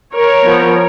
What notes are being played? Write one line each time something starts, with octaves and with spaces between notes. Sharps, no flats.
A#4 C#5
F3 B3